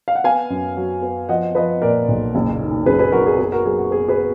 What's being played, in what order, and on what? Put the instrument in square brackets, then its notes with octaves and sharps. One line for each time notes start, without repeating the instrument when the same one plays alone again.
[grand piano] F5
F#5
B3 F5 G#5
F#2
F#3
B3
F3 D#5 F#5
F3 B4 D#5
A#2 A#4 D5
B1
F#1
D#3
F#2 G#4 B4
G#4 B4
F#2 F#4 A#4
G#4
B3 G#4
F#4 A#4
F#3 G#4
F#4
B3 G#4
G#4 B4
B3